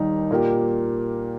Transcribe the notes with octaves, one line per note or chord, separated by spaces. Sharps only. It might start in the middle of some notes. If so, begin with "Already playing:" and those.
Already playing: D#2 D#3 G3 D#4
A#2 A#3 G4